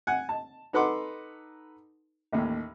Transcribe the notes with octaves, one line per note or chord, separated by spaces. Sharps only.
F#5 G#5
A5
D#4 A4 B4 F#5 C6 D6
A1 D#2